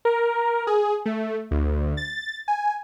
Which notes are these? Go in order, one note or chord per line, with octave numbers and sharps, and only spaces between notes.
A#4
G#4
A3
D2
A6
G#5